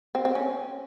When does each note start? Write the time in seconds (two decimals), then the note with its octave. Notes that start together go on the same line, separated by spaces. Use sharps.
0.15 C4
0.25 C4
0.35 C#4